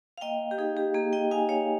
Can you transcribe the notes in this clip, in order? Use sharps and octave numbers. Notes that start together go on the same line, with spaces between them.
F5
A#3 D#5 G5
G4
D#4 G#4
G4
A#3 G#4
D#5 G5
D#4 F5 G#5
C#5 F5